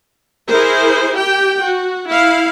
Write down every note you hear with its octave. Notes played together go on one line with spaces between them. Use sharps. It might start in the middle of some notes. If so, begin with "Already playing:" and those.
E4 G#4 A#4 C5
G4 G5
F#4
E4 F5